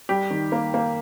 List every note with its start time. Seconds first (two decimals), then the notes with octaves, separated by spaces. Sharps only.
0.09 G3 G4
0.30 D#3
0.52 A#3
0.74 A#3